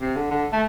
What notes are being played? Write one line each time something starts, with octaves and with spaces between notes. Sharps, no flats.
C3
D3
D3
A3